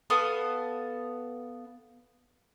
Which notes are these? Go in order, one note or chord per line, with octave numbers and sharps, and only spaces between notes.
B3 A4 F5 D#6